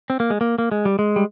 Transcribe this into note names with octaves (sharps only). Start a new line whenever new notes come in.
C4
A#3
G#3
A#3
A#3
G#3
G3
G#3
G3